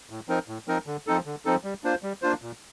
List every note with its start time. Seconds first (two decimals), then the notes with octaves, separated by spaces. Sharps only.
0.10 A2
0.29 F3 C4 D#4 A#4
0.48 A2
0.68 F3 C4 D#4 A#4
0.87 D3
1.07 F3 C4 D#4 A4
1.26 D3
1.45 F3 C4 D#4 A4
1.64 G3
1.84 A#3 D4 F4 C5
2.03 G3
2.22 A#3 D4 F4 C5
2.42 A#2